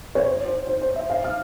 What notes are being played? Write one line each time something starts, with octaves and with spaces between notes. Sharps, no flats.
C#5
C5
C5
C5
C5
E5
F5
F6